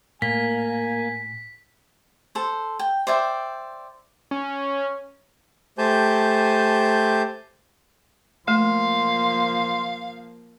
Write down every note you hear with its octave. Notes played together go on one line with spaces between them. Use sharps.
A2 A#3 G#5 B6
A4 C5
G5
C5 D5 E5 G5
C#4
A3 G4 C5 G#5 A5 G6
F3 A3 A#3 F5 C6